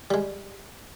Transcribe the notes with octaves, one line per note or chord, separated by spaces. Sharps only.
G3 G#3